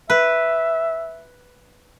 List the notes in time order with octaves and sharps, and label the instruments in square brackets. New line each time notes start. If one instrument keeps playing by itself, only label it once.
[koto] B4 [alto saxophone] E5